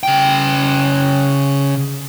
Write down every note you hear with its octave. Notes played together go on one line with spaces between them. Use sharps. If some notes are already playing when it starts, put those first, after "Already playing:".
C#3 G5